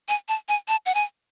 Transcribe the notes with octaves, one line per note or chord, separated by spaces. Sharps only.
G#5
A5
G#5
A5
F#5
G#5